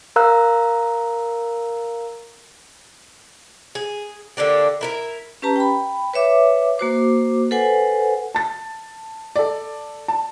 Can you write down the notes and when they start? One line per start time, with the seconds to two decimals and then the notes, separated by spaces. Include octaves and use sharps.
0.16 A#4 F5 A#5 E6 F#6
3.75 G#4
4.37 D3 A#3 D4 G4
4.81 E4 A#4 E5
5.42 C#4 G4 B4 A5 A#5
5.56 G5 B5
6.14 B4 C#5 E5 D6
6.78 A#3 F#4 C5 D6
7.51 A4 B4 C5 F#5 G#5
8.35 A5 A6
9.36 A4 D5
10.08 A5